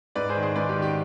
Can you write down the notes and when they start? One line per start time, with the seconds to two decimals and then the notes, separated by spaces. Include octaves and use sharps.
0.15 G#2 B4 D5
0.29 G#4 C5
0.36 D#3
0.43 G#4 C5
0.56 G#2 B4 D5
0.69 G4
0.76 D#3
0.82 G4